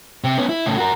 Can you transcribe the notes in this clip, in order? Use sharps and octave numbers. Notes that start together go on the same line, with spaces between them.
C3
B3 C#4
E4
A2 C#3
F#4 A#4